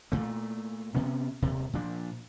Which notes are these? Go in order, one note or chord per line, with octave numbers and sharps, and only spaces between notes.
A#2 A3
C3 B3 C#4
D#1 C3
A#2 F3 D4